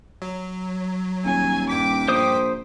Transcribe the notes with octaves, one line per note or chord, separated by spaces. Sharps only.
F#3
D#1 G#5
G2 G5 D6 B6
A#1 C5 D#6